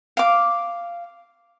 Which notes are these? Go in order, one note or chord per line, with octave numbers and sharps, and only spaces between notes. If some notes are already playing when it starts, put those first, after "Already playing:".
F5 D6